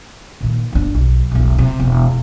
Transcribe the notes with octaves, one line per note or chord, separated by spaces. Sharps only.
A#2 D#3
G1 D4
B1
E1 B1
C3
E1